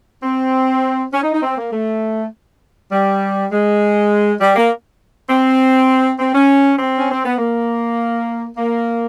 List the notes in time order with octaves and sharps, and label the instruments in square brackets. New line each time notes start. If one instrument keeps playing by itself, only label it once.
[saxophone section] C4
C#4
D#4
D#4
C4
A#3
A3
G3
G#3
G3
A#3
C4
C4
C#4
C4
C#4
C4
B3
A#3
A#3